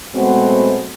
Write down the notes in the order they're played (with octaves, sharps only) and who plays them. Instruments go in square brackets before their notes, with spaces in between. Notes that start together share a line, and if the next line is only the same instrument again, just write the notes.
[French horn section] B2 F#3 G#3 A3 B3 C4